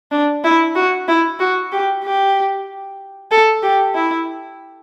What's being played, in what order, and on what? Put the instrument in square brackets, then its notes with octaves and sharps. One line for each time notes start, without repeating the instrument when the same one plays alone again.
[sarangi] D4
E4
F#4
E4
F#4
G4
G4
A4
G4
E4